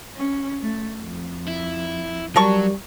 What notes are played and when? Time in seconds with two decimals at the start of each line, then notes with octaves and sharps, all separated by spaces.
0.16 C#4
0.62 A3
0.99 F2
1.48 E4
2.36 F#3 G3 A#4 A5 C#6